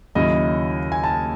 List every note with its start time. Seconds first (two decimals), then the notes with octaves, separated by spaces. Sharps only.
0.15 D#2 C#3 F#3 C#4 E4 D#5
0.92 G#5
1.04 A5